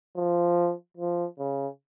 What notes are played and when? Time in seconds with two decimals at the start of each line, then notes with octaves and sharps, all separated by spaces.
0.16 F3
0.97 F3
1.39 C#3